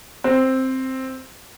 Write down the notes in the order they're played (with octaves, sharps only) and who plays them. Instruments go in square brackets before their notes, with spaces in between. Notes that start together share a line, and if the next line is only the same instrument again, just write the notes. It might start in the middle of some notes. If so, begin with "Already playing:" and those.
[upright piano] C4